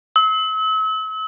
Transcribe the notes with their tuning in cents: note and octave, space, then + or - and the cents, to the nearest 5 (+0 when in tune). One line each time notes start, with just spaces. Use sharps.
E6 -40